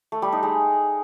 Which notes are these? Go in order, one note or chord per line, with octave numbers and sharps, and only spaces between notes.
A3
G3
D#4
G#3